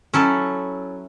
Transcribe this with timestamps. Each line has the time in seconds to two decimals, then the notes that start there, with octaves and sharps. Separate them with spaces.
0.14 F#3 C#4 E4 A4